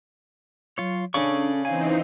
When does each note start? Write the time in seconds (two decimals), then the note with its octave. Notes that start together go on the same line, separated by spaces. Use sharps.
0.78 F#3 F4 C#5
1.14 C#3 C#4 D4 A4 D5 C#6
1.65 E3 C4 D#4 F5 G#5